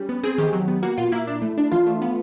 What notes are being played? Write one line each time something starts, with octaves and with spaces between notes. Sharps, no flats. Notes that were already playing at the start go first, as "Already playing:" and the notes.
Already playing: G3 C#4
B3
C4 G#4
D#3 G4
F#3
B3
A#3 F#4
A#2 F4
A#3 E4
D4
A3
D4
E3 F4
A3
B3